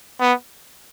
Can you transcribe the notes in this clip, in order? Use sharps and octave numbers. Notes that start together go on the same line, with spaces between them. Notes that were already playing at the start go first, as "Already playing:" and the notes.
B3